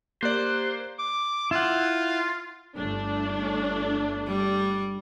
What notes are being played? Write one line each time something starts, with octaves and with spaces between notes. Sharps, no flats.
A#3 G4 C5 D5 F#6
D6
E4 F4 F#5
G1 A3 D4
G3